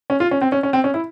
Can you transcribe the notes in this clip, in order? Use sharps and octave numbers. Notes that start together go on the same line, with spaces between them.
C#4
F4
C#4
C4
C#4
C#4
C4
C#4
E4